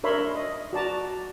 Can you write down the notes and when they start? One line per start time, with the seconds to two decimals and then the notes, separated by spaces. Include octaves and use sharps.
0.03 D4 A#4 C#5 E5 B5 C6
0.35 D#5
0.73 F#4 D5 A5 A#5